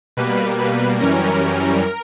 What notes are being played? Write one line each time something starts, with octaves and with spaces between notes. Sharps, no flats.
B2 G3 A#3 B4
B4
F#2 E3 G3 C#4 A#4